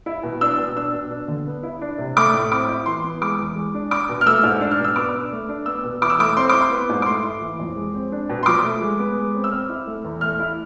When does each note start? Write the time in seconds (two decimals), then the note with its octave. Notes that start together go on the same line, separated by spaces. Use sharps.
0.06 E4
0.23 B2
0.41 D4 E6
0.58 B2
0.76 D4 E6
0.93 B2
1.11 D4
1.28 D3
1.47 B3
1.63 E4
1.81 D4
1.98 C3
2.17 A3 D6
2.34 A2
2.51 C4 D6
2.69 E4
2.86 E3 C6
3.04 B3
3.21 G#3 D6
3.39 E2
3.56 G#3
3.74 D4
3.91 D4 D6
4.09 B2
4.21 F6
4.26 A3 E6
4.43 G#2
4.61 D4
4.71 F6
4.79 B2
4.84 E6
4.96 B3 D6
5.14 D4
5.32 A3
5.49 D4
5.66 B3 E6
5.84 B2
6.02 E3 D6
6.10 E6
6.19 A3 D6
6.37 C4 C6
6.49 E4 D6
6.61 C6
6.71 B3
6.89 G#2
7.02 D6
7.06 A3 C6
7.24 E4
7.41 E3
7.59 F2
7.76 G#3
7.94 C4
8.12 D4
8.29 B2
8.43 C6
8.46 F3 D6
8.64 A3
8.81 G#3
8.99 B3
9.17 G#3
9.34 C4
9.44 E6
9.51 C4 F6
9.69 E4
9.87 A3
10.04 E2
10.21 A3 F6
10.39 E4